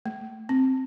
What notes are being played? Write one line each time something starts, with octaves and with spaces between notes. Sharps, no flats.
A3
C4